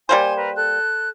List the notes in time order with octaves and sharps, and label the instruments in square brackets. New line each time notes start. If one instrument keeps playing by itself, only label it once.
[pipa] G3 A#3 C5 [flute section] G#5 C6 G#6
[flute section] A#4 B4
A4 F#6